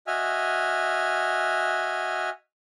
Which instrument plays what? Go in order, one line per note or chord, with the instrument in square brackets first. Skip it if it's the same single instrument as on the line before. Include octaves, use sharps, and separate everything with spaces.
[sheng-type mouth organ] F#4 D#5 E5 G#5 F6